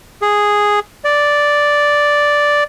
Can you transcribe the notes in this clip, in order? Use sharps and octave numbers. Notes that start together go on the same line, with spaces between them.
G#4
D5